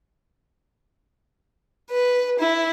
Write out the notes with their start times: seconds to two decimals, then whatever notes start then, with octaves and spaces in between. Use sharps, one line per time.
1.89 B4
2.38 E4